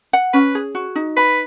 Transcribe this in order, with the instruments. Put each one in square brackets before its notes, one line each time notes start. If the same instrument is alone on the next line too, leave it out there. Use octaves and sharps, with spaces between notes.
[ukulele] F#5
[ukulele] C#4 [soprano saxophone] B4
[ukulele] G#4
F#4
D#4
[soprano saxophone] B4 [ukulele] B5